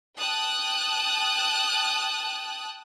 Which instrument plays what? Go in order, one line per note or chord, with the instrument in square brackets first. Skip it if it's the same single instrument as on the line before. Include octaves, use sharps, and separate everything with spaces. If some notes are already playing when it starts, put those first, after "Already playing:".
[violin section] G5 A5 D#6 F#6